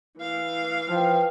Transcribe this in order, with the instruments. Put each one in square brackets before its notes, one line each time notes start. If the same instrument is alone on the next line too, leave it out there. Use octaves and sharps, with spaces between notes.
[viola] E3 F5
[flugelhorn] F3 [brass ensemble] B4 G5